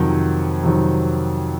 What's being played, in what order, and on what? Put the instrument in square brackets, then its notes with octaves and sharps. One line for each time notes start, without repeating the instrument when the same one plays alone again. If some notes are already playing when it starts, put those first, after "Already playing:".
Already playing: [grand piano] F2 C3 D#3 F#3
F2 C3 D#3 F#3